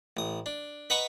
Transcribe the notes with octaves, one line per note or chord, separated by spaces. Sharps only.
A1 D#6
D4
B4 D#5 F#5 A#5 B5 C#6